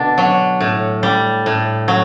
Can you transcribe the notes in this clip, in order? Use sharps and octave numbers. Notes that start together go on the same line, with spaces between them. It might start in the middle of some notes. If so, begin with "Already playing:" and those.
Already playing: B2 D3 D4
F#3
A2
G3
A2
F#3